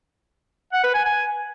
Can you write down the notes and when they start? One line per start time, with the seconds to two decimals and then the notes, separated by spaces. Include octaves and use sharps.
0.73 F#5
0.84 B4
0.94 G#5
1.05 G#5